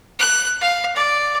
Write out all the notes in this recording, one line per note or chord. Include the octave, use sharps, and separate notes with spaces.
F#6
F5
D5